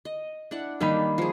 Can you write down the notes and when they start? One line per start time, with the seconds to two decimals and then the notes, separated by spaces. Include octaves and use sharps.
0.05 D#5
0.51 D4 E4 F#5
0.81 D#3 G3 A#3 D4 D#4 B5
1.18 F3 G#4